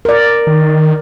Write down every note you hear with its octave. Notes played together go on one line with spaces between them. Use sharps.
A#4 D5
D#3